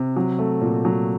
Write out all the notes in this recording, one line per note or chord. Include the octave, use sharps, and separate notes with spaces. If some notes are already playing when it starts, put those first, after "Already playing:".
Already playing: C3
F#3
A3
A#2
F#3